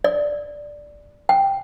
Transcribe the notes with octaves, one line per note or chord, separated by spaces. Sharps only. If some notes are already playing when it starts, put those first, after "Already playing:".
D5
G5